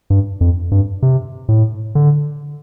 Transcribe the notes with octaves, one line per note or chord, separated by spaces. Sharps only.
G2
F2
G2
C3
A2
D3